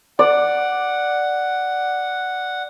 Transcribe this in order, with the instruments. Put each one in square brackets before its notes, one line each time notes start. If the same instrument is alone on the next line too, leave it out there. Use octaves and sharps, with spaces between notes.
[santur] D5 [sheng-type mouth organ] F#5